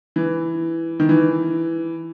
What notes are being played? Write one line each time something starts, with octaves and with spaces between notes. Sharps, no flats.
E3
D#3
E3